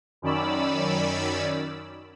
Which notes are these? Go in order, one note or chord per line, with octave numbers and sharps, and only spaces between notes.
F#2 D#3 C#4 D5 B5 E6